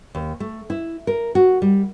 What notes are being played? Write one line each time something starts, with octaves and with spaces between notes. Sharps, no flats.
D#2
A3
E4
A#4
F#4
G3